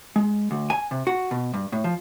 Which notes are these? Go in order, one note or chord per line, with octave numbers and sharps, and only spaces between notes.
G#3
D2
G#5
C3
F#4
B2
G2
A2
F3